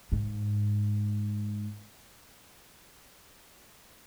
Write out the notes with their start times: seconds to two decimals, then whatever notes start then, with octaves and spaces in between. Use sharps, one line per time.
0.12 G#2